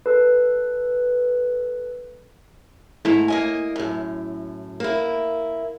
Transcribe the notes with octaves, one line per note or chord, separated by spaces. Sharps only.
A4 B4
G#2 A3 E4 A#5
A#3 D#5 G#5
F#2 A2
A#3 E4